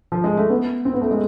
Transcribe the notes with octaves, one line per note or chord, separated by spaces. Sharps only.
F3
G#3
A3
B3
C4
B3
A3
G#3